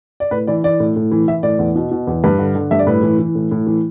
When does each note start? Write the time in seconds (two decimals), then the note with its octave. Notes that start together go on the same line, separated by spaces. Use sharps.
0.20 D5
0.31 A2 B4
0.47 E3 D5
0.64 E3 D5
0.80 A2
0.96 A2
1.11 E3
1.28 E3 E5
1.43 A2 D5
1.59 E2
1.76 B2
1.91 B2
2.07 E2
2.24 G2 B4
2.39 D3
2.55 D3
2.71 G2 E5
2.79 D5
2.87 A2 B4
3.02 E3
3.19 E3
3.35 A2
3.51 A2
3.67 E3